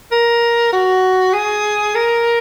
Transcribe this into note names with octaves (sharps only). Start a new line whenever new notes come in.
A#4
F#4
G#4
A#4